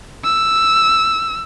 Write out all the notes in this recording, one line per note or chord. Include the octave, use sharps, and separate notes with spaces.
E6